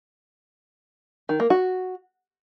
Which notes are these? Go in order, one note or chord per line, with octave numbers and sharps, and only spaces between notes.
D#3
A#3
F#4